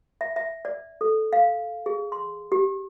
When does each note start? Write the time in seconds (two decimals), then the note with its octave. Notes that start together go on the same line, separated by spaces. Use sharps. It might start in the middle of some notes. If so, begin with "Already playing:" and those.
0.21 E5
0.36 E5
0.65 D5
1.01 A4
1.33 F5
1.86 G#4
2.12 C6
2.52 G4